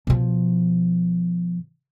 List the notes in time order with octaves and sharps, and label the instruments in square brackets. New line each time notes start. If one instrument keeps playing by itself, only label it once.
[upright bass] B2 F3